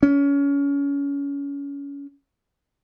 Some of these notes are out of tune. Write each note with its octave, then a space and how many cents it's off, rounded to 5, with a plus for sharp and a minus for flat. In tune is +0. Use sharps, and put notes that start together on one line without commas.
C#4 +25